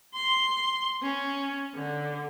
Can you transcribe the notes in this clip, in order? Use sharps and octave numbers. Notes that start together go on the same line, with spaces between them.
C6
C#4
D3